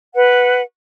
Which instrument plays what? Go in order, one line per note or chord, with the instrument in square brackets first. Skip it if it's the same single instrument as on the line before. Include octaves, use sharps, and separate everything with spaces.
[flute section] B4 F#5